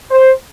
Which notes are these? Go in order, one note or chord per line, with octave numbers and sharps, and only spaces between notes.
C5